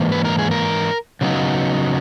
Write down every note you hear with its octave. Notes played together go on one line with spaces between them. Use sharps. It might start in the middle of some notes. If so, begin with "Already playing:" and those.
Already playing: G#2 E3 A#3
B4
A#4
G#4
A#4
C#3 F#3 B3 D#4